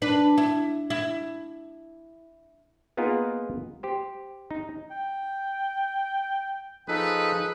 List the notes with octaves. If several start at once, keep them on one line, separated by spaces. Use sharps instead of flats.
D4 B4
E4
E4
A#3 B3 D#4 F4 G#4 A#4
G4 C5
D#4
G5
F3 D#4 G#4 A4 B4